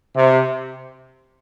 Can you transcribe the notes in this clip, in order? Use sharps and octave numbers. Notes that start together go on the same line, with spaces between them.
C3